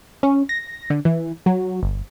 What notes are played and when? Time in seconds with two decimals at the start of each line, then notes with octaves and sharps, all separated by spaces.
0.23 C#4
0.49 A#6
0.90 D3
1.05 E3
1.46 F#3
1.83 G1